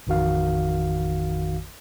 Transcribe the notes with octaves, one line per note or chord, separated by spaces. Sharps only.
A1 F2 D#3 F#4 F5